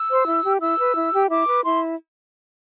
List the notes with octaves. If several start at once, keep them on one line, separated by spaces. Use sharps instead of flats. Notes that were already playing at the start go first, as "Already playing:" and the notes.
Already playing: E6
C5
E4
G4
E4 E6
B4
E4
G4
E4 D6
B4
E4 C6